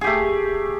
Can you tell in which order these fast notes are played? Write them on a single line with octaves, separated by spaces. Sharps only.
G#4 G4 A3